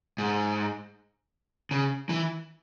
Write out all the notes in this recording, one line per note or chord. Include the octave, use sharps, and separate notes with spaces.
G#2
C#3
E3